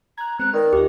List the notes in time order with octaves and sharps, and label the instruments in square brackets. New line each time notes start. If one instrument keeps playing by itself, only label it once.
[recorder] A#5 [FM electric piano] F#6 G#6
[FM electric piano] G#3 B3 C4 [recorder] F#6
[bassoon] D#3 [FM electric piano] B4 D#5 A#5 [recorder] D5
[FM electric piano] D#2 D#4 F4 [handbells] G4